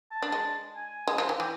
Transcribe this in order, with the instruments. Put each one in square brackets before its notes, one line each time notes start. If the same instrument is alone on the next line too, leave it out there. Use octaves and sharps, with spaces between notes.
[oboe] A5
[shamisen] D4
G#3
[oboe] G#5
[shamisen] G#3
F3
E3
[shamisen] E3 [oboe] G5